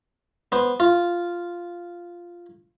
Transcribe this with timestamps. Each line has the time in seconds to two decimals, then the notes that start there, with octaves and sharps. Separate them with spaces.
0.52 B3 C5
0.80 F4